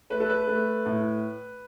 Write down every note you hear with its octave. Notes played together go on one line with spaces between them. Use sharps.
A3 B4
A4
B4
A3
A2